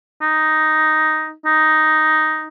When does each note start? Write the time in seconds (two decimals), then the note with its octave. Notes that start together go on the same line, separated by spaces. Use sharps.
0.22 D#4
1.46 D#4